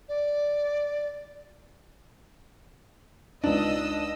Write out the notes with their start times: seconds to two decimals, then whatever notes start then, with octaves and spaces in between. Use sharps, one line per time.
0.08 D5
3.44 C#2 D4 D#4 D#5 D#6 E6